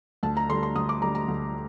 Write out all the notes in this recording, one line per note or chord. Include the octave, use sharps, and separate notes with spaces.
D2 A5
A#5
D3 G3 C6
C6
D2 D#6
D6
D3 G3 A#5
A#5
D2